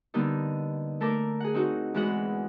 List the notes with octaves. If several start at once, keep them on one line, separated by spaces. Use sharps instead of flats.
D3 G3 A#3 B3 D#4
A3 A4 A#4 D6
G#4 F#5
C4 D#4 F#4
E2 E3 G#3 F#4 G#4 F#5